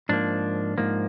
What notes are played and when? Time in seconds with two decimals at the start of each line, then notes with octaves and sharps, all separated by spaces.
0.09 G#2 F3 A#3 D4
0.77 G#2 F3 A#3